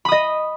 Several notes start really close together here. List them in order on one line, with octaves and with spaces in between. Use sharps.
B5 D#6 D#5